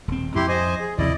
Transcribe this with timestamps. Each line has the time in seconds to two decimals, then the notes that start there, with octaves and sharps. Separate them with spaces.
0.08 D#1 C4
0.36 F2 E4 G4 C6
0.49 C5 D#5 G#5
0.81 G#4
0.98 D#2 C3 F3 E4 D5 D#5